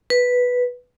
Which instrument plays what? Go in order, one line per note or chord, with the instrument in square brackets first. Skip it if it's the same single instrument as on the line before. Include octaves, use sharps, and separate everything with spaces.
[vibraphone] B4